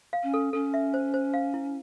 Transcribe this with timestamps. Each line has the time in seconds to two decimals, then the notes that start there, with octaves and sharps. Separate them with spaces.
0.13 F5
0.23 C#4
0.34 A4
0.53 C#4 A4
0.74 E5
0.94 C5
1.14 C5
1.34 F5
1.54 E4